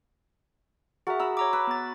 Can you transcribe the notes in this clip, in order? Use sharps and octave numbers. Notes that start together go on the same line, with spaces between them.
F#4 G#4 A#4 E5
E5 A#5 B5
C#5 A#5 D6
B4 E6
B3 A6